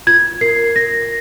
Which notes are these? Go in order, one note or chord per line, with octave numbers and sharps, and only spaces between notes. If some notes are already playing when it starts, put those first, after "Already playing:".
F4 G#6
A#4 C7
A#4 A#6